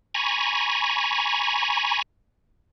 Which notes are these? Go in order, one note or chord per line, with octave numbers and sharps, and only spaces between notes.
G#5 A#5 B5 C#6